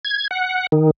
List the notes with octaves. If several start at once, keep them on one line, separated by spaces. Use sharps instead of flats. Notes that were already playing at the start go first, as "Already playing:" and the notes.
G#6
F#5
D#3